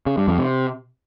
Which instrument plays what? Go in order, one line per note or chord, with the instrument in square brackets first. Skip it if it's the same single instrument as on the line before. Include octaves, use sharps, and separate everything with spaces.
[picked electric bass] C#3
G2
F2
C3